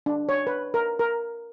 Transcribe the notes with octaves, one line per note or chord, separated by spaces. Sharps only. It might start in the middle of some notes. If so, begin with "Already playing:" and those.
D4
C#5
B4
A#4
A#4